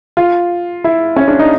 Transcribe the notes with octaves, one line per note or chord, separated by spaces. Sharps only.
F4
E4
C#4
D4
D#4